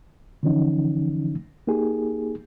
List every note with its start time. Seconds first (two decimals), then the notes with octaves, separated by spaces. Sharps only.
0.43 D3 E3 F3 C#4 D#4
1.67 A#3 D#4 G4 G#4